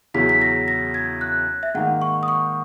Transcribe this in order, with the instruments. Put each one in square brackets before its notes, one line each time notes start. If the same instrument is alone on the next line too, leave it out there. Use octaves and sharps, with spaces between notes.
[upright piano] E2 C#3 F#3 C#4 E4 [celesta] B6
[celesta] B6
A#6
A#6
G#6
F#6
E5
[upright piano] G#2 D#3 A#3 D#4 [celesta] F#5
[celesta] C#6
D#6
C#6